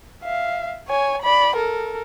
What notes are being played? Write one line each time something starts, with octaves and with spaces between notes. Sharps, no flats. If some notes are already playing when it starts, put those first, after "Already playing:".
E5 F5
C#5 G#5
D5 B5
A4 A#4